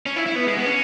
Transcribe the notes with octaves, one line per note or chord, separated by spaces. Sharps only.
C#4
E4
E4
B3
G#3
B3
C#4